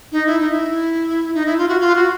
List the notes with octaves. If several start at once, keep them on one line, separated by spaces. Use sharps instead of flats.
D#4
E4
D#4
E4
D#4
E4
F4
F#4
F4
F#4